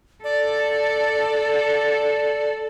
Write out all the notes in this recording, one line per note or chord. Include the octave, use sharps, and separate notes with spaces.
A4 D5